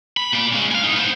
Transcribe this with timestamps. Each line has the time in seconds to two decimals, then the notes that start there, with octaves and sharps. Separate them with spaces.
0.17 B5
0.33 A#2 D5
0.53 G#3 C#4
0.71 F5 G#5
0.84 A2 D#4
0.97 B3 C5